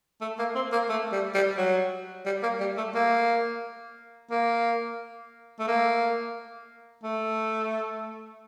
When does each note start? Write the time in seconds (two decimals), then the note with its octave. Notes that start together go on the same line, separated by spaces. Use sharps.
0.21 A3
0.39 A#3
0.55 C4
0.72 A#3
0.89 A3
1.12 G3
1.34 G3
1.57 F#3
2.26 G3
2.42 A#3
2.60 G3
2.77 A3
2.95 A#3
4.31 A#3
5.59 A3
5.68 A#3
7.03 A3